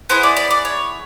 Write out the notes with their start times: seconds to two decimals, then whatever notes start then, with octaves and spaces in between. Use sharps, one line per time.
0.09 B3 E4 G#4 C5
0.23 D5
0.37 D5
0.51 D5
0.65 C#5